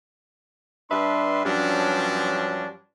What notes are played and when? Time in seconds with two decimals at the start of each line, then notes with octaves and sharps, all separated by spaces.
0.90 G2 D4 B4 E5 C6
1.44 G2 F3 F#3 C#4 D4